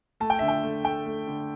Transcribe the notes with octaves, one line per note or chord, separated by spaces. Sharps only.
A3 A5
G5
D3 E5
G5
A3
A3 G5
A3
D3